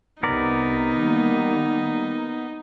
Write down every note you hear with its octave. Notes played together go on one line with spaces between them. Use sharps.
C2 C3 B3 D#4 A#4 D5
D#3 G3 A#3